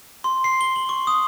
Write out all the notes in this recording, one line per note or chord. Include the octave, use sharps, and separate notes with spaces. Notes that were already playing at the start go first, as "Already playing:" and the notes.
C6
C7
G7
F#7
C#6
D#6